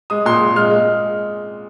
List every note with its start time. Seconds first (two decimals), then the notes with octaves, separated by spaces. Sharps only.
0.10 G#3 D#6
0.25 A#2 C6
0.41 G#3
0.56 G#3 F6
0.70 G#3